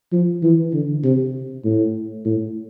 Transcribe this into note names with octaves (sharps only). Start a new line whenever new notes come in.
F3
E3
D3
C3
A2
A2